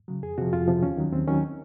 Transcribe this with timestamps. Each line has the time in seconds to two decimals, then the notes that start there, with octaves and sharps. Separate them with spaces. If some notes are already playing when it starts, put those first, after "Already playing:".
0.08 C#3 F#3
0.23 F2 G#4
0.38 C3 F3 F#4
0.53 F2 F4
0.68 C3 F3
0.83 D#2 C#4
0.97 D#3 F#3
1.13 D#2 C4
1.27 D#3 F#3 C#4